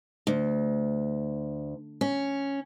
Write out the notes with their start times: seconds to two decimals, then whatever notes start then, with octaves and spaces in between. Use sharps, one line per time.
0.27 D2
2.01 C#4